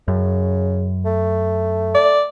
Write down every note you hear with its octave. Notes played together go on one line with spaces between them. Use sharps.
F#2 C#3
A3
D5